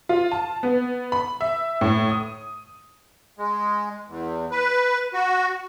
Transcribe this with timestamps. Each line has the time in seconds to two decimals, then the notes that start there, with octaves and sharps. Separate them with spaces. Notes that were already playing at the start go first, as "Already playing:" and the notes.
0.09 F4
0.32 A5
0.63 B3
1.12 B5
1.41 E5
1.81 A2
2.09 D#6
3.38 G#3
4.08 E2
4.51 B4
5.14 F#4